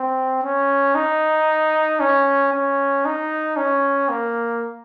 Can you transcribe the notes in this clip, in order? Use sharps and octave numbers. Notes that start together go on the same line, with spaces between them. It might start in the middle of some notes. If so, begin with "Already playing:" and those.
Already playing: C4
C#4
D#4
C#4
C#4
D#4
C#4
A#3